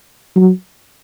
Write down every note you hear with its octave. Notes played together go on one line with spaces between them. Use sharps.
F#3